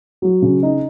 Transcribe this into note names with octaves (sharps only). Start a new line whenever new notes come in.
F#3
C#3
D#4